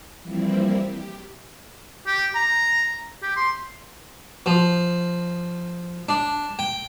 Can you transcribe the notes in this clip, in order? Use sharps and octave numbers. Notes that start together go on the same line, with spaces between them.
E3 F3 G3 A#3 C4 E4
G4
G4
A#5
G4
C6
F3
D4
G5